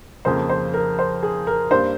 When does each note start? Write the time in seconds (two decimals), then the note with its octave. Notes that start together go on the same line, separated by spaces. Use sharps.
0.25 F2 C#3 F3 A#3 C5
0.49 C5
0.74 A#4
0.99 C5
1.23 G#4
1.47 A#4
1.71 G2 G3 A#3 C5